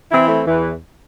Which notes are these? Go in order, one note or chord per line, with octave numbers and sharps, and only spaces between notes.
E3 C4 E4
A3 C4
E2 E3